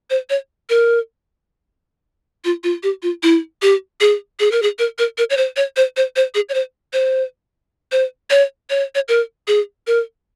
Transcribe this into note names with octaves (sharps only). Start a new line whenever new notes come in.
C5
C#5
A#4
F4
F4
G4
F4
E4
G4
G#4
G#4
A#4
G#4
A#4
A#4
A#4
C#5
C5
C#5
C5
C5
C5
G#4
C#5
C5
C5
C5
C#5
C#5
C#5
A#4
G#4
A#4